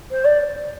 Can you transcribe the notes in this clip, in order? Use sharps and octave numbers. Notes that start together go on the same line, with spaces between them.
C5
D5